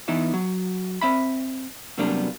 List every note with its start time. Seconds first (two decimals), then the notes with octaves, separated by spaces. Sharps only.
0.08 E3 B3 D#4 E4
0.34 F#3
1.01 C4 E5 B5
1.98 C3 F#3 G3 A#3 B3 D4